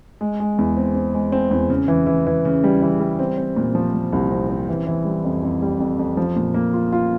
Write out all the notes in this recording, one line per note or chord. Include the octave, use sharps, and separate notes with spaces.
G#3
G#3
E2
C4
C4
G#3
C4
E2
C#3
E3
E3
E3
C#3
G3
E3
G3
C4
C4
A#2
F3
A#2
C2
C4
C4
E3
E3
G3
F2
F2
G3
F2
F2
F3
A#2
A#3
F4
F4